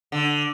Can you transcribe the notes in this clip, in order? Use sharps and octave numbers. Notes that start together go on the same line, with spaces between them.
D3